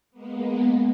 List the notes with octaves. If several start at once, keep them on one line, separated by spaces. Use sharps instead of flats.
G#3 A#3 B3